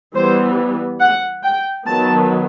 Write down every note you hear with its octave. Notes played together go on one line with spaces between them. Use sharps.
E3 G3 B3 C5
F#5
G5
D#3 F#3 B3 A5